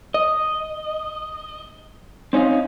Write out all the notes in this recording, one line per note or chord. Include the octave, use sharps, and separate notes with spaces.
D#5
C4 C#4 D#4 D#5 F5